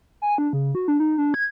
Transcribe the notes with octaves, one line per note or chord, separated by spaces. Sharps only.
G#5
D4
C#3
F#4
D4
D#4
D4
G#6